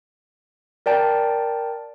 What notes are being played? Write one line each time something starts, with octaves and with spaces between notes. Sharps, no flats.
A#4 D5 G5 A5